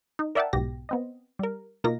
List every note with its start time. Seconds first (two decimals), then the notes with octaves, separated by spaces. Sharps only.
0.19 D#4
0.35 A#4 D5 E5 F#5 G5 A5
0.53 B1 G#2 B2 G4 A#6
0.89 B3 C4 D#5
1.39 G3 A#4
1.84 B2 A#3 D#4 F4 A#4 A#6